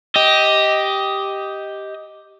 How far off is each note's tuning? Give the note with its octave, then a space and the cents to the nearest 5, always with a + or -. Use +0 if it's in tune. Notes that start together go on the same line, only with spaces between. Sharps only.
G4 +0 D#5 +10